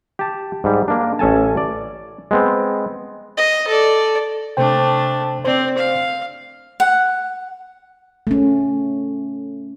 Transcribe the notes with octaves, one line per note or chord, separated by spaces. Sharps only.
G4 A5
G#2 G3
A#3 D4
A1 C#4 A4 G#5 A5
D5
G#3 B3 C4
D#5
A4 D5
C3 A3 D4 C5 G5
C4 C5 D5
F5
F#5
A3 C#4